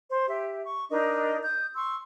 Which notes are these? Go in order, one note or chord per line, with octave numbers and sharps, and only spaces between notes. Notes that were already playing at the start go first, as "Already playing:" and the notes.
C5
G4 E5
C#6
D4 D#4 A#4 D#5
D#6 G6
C6 C#6 E6